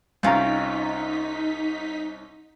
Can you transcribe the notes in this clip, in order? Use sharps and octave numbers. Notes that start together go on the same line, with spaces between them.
C2 C#4 D#4 F4 G5 A#5 B6